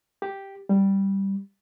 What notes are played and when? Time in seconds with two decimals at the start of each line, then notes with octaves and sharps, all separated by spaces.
0.22 G4
0.69 G3